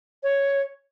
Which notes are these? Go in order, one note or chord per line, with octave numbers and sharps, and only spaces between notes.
C#5